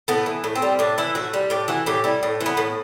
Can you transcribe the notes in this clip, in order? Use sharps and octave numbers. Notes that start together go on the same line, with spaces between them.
A2 B3
E3
A2
C4
G3
A2 D4
E3 E4
A2 F#4
G3
A2 G4
E3 F#4
A2 G4
G3 E4
A2
E3
B3
A2